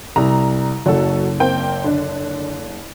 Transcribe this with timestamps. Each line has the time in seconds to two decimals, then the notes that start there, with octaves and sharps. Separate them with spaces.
0.16 C2 A#5
0.86 F#1 F#3 F#4 A4
1.40 A#3 C4 G5
1.84 D3 D4